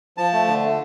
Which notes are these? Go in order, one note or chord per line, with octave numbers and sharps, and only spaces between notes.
F3 A5
A3
D3